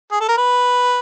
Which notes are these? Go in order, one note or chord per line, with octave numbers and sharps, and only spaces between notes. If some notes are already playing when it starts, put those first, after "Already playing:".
G#4
A4
A#4
B4